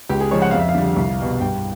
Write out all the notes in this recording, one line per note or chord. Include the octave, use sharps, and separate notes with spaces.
C#2 G4
G#4
C#3 F3 G#3 C#5
F#5
F2 F5
E5
F5
D3 G3
C2
B2 G3
G2 G5